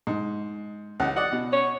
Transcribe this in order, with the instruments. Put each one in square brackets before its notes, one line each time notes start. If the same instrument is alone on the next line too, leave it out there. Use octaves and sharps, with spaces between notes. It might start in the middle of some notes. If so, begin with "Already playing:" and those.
[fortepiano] G#2
C#2 F#5
[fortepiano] D5 D#5 [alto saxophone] F#5
[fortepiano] B2
[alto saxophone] C#5